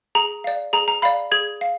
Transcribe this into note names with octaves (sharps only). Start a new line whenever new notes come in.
G#4 A#5
D5 F5
G#4 A#5
A#5
D5 F5 B5
G#4 G#6
F5